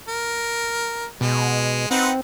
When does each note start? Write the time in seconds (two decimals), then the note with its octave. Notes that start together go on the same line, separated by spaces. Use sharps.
0.08 A#4
1.21 B2 G#3
1.91 C4 D#4 B4 F#5